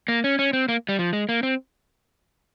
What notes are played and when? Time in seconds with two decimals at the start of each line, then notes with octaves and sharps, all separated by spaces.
0.08 A#3
0.24 C#4
0.39 C#4
0.53 C4
0.68 A#3
0.89 G3
0.99 F3
1.13 G#3
1.29 A#3
1.43 C4